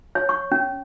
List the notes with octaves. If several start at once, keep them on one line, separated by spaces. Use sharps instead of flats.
C#5
C#6
C#4